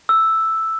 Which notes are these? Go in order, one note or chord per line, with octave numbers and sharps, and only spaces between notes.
E6